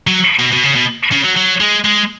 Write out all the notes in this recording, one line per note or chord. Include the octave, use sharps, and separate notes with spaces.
F#3
B2
B2
C#3
B2
C#3
F#3
F#3
G#3
G#3